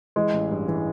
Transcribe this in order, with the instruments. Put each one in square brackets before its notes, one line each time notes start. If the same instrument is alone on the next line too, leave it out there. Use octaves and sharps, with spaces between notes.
[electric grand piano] E3 [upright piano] G#3
[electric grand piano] A1
G2
E3